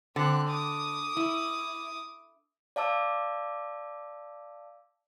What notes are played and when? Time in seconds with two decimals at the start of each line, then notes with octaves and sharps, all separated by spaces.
0.16 D3 C4 F#6
0.49 D6 D#6
1.17 E4
2.76 D5 F5 A5 D6 E6